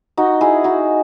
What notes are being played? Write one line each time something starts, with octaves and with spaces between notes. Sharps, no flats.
D#4 F#4
E4 G#4
D#4 F#4